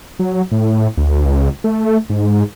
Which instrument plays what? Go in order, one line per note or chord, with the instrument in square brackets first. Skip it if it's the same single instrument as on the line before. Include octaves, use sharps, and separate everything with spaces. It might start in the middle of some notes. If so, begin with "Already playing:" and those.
[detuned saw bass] F#3
A2
D2
C#2
A3
G#2